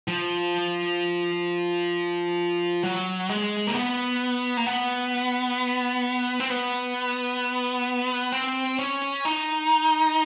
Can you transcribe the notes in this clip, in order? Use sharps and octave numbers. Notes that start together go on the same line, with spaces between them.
F3
F#3
G#3
A#3
B3
A#3
B3
C4
B3
C4
C#4
D#4